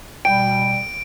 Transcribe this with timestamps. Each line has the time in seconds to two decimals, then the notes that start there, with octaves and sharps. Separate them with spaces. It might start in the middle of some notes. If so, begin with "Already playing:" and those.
0.25 B2 G3 G5 D7